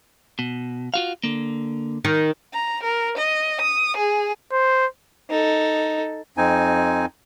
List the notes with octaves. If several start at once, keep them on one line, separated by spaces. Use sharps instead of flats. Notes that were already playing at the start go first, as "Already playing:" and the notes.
B2
F4 F#4 F5
D3 A#3
D#3
A#5
A#4
D#5
D#6
G#4
C5
D#4 A4
F2 C4 D#4 G#5